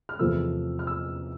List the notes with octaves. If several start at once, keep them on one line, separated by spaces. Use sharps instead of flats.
F6
E2 C3 F3 A3 C4 E6
F6
E6